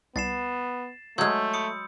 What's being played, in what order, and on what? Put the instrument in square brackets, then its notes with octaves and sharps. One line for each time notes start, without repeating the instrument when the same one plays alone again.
[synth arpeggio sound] C2 [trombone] B3 [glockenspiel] A6 C7 E7
[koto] F#3 G#3 [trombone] A3 [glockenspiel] C6 E6 G6
[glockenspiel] B5 D#6 C#7